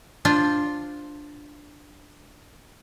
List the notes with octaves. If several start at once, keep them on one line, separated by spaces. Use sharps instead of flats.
D4 F4 C5